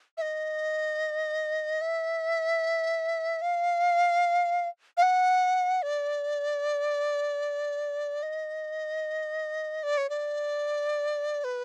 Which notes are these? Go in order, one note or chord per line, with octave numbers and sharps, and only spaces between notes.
E5
D#5
E5
F5
F5
F#5
D5
D#5
D5
C#5
D5
B4